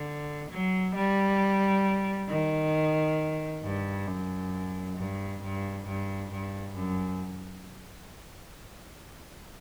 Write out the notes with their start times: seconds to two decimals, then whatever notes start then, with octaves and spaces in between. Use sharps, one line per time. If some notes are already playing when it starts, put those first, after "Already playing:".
Already playing: D3
0.50 F#3
0.95 G3
2.29 D#3
3.63 G2
4.07 F#2
4.97 G2
5.42 G2
5.86 G2
6.31 G2
6.75 F#2